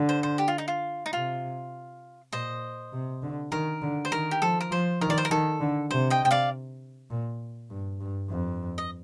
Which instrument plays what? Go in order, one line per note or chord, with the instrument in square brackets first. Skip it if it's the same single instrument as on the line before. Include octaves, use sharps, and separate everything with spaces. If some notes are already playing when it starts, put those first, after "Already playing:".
Already playing: [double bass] D3
[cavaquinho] C5
C5
G4
F4
D#4
F4
D#4
[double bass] C3 [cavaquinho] F4
[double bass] A#2 [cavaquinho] C5 D#5
[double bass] C3
D3
[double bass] D#3 [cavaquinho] A#4
[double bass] D3
[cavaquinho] C5
[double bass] D#3 [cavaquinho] A#4
[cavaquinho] G4
[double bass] F3 [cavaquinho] A4
[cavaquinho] A#4
[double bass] F3 [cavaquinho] C5
[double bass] D#3 [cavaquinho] A#4
[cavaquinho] D5
C5
A#4
[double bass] D#3 [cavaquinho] A4
[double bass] D3
[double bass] C3 [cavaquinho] C5
[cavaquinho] D#5 G5
G5
D5 F5
[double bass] A#2
G2
G2
F2
[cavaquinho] D#5